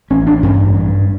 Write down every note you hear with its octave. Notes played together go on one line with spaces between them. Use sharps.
A1 C#4
D4
G2 C#4
G2